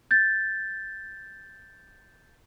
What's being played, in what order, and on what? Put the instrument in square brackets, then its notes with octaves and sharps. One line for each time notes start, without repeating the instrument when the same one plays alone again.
[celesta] G6 A6